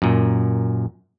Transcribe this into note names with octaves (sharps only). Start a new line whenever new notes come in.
F#2 A#2